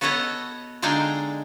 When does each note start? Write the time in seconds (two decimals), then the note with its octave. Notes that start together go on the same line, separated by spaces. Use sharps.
0.01 B3 F#4 A4 C#5 D#5 F#5
0.82 D3 G#3 D4 D#4 F5 G5